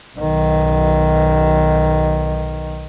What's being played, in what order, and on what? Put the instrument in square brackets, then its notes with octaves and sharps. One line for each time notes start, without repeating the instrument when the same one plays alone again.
[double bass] B1 D#3